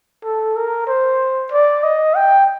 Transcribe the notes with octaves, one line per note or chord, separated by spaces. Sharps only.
A4
A#4
C5
D5
D#5
G5